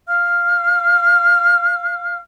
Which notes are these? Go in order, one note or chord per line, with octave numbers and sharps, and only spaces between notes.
F5 F6